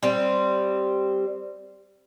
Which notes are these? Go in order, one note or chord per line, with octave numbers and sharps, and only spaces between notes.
G3 C4